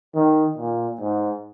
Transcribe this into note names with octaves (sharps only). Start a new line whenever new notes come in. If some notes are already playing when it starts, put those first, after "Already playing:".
D#3
A#2
G#2